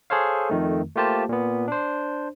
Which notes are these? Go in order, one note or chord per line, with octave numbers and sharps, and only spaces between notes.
G#4 A4 C5 C#5 F5
F2 D#3 A3
A3 A#3 F4 G4 C5 A5
A#2 B3
D4 C5